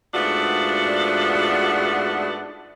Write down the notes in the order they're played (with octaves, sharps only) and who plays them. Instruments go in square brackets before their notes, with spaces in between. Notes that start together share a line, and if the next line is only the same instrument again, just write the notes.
[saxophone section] G#2 A3 B3 D4 F4 F#4